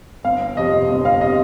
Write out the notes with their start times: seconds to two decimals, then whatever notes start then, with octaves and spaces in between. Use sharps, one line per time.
0.24 G1 F5
0.57 F2 C3 D#5
0.89 G1 D#5
1.05 F5
1.21 C3 D#5